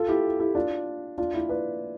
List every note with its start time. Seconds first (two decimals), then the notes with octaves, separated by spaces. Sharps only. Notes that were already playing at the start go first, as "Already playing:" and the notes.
Already playing: F4 A4
0.08 E4 G4
0.40 E4 G4
0.55 D4 F4
1.18 D4 F4
1.34 E4
1.49 B4 D5